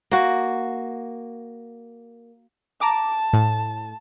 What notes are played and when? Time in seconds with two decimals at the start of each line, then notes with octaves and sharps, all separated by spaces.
0.11 A#3 F#4
2.81 A5 A#5 D6
3.33 A2